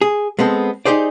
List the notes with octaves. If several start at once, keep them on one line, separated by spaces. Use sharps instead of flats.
G#4
G#3 B3 C4 A4
D#4 G4 G#4 C5 D5